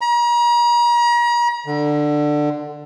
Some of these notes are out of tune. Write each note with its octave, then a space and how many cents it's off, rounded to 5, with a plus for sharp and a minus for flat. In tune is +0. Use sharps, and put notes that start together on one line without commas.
A#5 +40
D3 +15